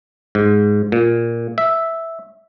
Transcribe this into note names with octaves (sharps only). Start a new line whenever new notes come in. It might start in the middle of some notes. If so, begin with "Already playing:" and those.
G#2
A#2
E5